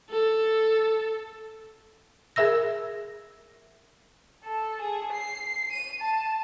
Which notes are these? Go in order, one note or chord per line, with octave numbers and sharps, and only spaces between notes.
A4
G#4 A#4 E5 E6 A#6
A4
G#4
C7
D#7
A5